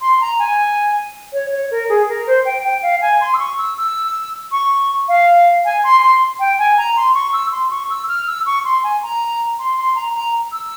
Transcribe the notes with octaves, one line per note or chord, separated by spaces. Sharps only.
C6
A#5
G#5
C#5
C#5
A#4
G#4
A#4
C5
G5
G5
F5
G#5
C6
E6
C#6
E6
E6
C#6
F5
G#5
C6
C6
G5
G#5
A#5
C6
C#6
E6
C6
C#6
E6
F6
E6
C#6
C6
G#5
A#5
C6
C6
A#5
A#5
E6